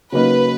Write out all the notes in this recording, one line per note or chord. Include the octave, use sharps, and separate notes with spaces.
C#3 F#3 A#3 D#4 F#4 B4